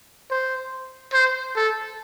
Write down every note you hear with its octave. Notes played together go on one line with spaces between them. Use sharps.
C5
C5
A4